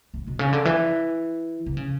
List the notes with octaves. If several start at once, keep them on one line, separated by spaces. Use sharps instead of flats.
A2
B2
C#3
D3
E3
D3
C#3